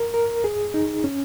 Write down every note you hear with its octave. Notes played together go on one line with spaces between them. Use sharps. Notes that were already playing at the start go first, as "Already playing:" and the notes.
Already playing: A#4
A#4
G#4
D#4
C#4